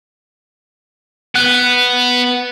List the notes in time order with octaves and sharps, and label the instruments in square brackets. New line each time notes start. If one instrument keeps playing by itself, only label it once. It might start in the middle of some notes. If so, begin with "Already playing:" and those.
[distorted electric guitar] B3 [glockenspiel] F#6